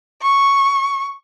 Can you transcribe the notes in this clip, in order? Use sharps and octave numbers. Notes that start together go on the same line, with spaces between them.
C#6